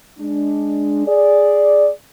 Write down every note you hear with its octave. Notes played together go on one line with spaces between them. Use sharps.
G#3 D4
G#4 D5